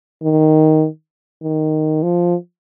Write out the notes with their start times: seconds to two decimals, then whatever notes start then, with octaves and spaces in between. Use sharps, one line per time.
0.23 D#3
1.43 D#3
2.03 F3